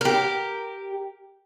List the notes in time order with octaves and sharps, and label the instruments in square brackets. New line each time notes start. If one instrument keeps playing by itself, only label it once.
[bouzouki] G4 A#4